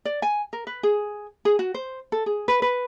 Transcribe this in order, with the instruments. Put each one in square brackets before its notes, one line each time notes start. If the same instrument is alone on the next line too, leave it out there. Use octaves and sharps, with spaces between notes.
[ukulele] D5
G#5
A#4
B4
G#4
G#4
F#4
C5
A4
G#4
B4
B4